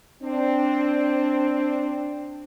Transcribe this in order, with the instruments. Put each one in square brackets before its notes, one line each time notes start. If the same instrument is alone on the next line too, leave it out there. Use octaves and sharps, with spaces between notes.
[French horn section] C4 D4